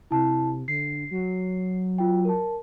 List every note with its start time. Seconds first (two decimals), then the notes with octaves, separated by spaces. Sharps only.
0.11 C3 E4 A5
0.68 D3 C7
1.11 F#3
1.98 F4 G5
2.25 A#4 A5